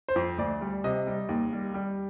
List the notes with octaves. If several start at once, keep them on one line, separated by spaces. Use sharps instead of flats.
C5
F2
D2 D5
G3
C3 D#5
G3
D#2
G3
G3